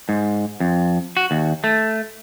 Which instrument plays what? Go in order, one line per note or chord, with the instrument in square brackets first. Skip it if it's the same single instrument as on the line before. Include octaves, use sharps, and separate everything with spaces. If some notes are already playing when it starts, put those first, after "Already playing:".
[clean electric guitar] G#2
F2
F#4
D#2
A3